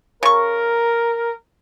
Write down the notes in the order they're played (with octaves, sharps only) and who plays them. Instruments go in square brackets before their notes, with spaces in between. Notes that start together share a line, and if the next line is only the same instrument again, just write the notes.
[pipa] C#3 C#6 [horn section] A#4